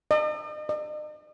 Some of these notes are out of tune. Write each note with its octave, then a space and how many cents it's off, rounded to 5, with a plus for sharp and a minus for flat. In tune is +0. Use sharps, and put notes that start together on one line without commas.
D#5 -40
D#5 -45